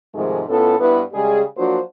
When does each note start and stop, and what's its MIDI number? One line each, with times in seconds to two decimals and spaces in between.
0.14 0.42 44
0.14 0.42 48
0.14 0.42 51
0.14 0.42 53
0.14 0.42 56
0.14 0.42 57
0.48 0.75 45
0.48 0.75 59
0.48 0.75 61
0.48 0.75 65
0.48 0.75 69
0.78 1.00 43
0.78 1.00 59
0.78 1.00 64
0.78 1.00 71
1.12 1.43 49
1.12 1.43 55
1.12 1.43 56
1.12 1.43 68
1.57 1.79 53
1.57 1.79 54
1.57 1.79 58
1.57 1.79 62
1.57 1.79 66
1.57 1.79 72